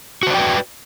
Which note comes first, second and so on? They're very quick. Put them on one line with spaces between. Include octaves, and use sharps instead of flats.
F#4 C5 D5 G5 B4